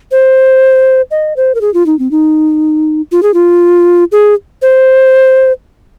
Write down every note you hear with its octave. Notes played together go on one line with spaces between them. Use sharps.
C5
D#5
C5
A#4
G#4
F4
D#4
C4
D#4
F4
G#4
F4
G#4
C5